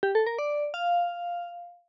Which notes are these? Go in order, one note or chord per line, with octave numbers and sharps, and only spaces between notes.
G4
A4
A#4
D5
F5